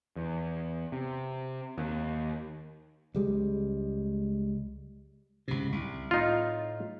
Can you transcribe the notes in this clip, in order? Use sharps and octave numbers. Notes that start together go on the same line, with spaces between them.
E2
C3
D#2
C#2 G3 G#3
C#2 G#2 C3
C2
A2 D#4 F4